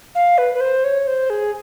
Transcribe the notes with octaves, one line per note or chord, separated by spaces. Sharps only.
F5
B4
B4
C5
C#5
C5
G#4